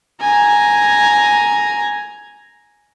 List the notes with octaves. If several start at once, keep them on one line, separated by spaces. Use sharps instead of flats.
G#5 A#5